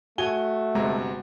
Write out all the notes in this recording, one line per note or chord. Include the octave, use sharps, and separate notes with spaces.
A3 F#4 G#5 G7
G1 C3 G#3 A#5